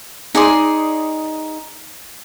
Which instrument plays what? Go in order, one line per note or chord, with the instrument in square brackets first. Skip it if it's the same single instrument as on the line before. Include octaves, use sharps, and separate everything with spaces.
[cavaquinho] D#4 G#4 D5 C6